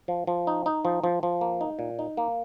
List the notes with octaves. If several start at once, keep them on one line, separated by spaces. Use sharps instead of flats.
F3
F3
D#4
D#4
F3
F3
F3
A#3
D#4
A#2
D#4
A#3